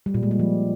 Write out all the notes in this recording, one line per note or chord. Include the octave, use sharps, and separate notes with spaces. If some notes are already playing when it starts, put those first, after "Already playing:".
G3
A#2
G#3
G3
F3